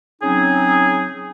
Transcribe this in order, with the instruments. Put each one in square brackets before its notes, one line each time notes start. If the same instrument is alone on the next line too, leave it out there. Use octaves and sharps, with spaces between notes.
[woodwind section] C#3 F#3 C4 C#4 D#4 G#4